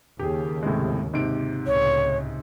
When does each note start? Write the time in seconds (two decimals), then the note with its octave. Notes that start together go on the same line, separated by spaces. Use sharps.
0.19 D#2 C#3 G4 G#4
0.63 A2 C3 G#3
1.14 G#2 C3 D7
1.67 C#2 A2 C#3 C#5